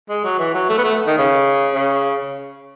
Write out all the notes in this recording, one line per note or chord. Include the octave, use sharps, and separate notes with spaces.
G#3
F#3
E3
F#3
A3
B3
A3
D#3
C#3
C#3